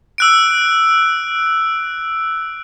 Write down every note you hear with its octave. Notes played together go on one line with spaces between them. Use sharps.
E6 F#6 D7